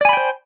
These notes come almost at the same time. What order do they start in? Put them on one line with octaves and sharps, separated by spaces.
D5 G#5 B5 G5 C5